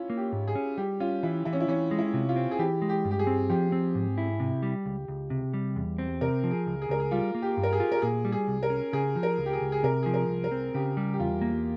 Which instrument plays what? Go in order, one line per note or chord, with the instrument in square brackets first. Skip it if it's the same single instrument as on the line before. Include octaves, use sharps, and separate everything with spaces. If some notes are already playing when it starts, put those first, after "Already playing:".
Already playing: [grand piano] C#4 E4 F4
[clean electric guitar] A#3
[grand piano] G4
[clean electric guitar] G#2
[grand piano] G#4
[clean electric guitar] C#4
[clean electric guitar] G3 [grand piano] G4
[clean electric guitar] C#4 [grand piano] F4
[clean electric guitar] E3 [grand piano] E4
[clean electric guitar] E3 [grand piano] E4
[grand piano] C#4
E4
[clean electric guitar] E3 [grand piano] C#4
[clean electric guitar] G#3
[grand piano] E4
[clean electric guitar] C3
[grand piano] F4
[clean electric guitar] C4
[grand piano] G#4
[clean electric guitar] E3 [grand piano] G4
[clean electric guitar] G#3
[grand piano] G4
[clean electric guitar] G2
[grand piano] G4
G#4
[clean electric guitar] C4
[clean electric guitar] F3 [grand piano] G4
[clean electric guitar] C4
G#2
E4
C3
G3
C#2
C#2
C3
G3
E2
C4
[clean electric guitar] C3 [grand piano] A#4
[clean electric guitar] F3
[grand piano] G#4
[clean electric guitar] C#2
[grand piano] G#4
[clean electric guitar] C#2 [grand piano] A#4
[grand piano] G#4
[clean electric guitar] G3 [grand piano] F4
[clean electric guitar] A#3
[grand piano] G4
[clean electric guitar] G2
[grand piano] A#4
G#4
[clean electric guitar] F4
[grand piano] A#4
[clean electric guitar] A#2 [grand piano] G#4
[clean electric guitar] G3
[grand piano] G#4
[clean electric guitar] C2
[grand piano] A#4
[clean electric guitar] C#4
[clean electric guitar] C#3 [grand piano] G#4
[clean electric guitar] F3
[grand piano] A#4
[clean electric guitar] C#2
[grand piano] G4
G#4
[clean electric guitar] C#2
[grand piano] G#4
[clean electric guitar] C3 [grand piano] A#4
[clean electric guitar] F3 [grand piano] G#4
[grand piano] A#4
[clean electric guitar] C2
[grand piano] A#4
[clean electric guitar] C4
[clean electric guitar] C#3 [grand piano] G4
[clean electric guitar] G3
[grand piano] G4
[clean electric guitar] E2 [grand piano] F4
[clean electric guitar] A#3